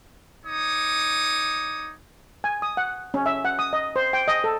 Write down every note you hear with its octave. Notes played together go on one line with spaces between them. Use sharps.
D#4 C#5 D6 D#6
G#5
D#6
F#5
C#4
E5
F#5
D#6
D#5
C5
G5
D#5
A4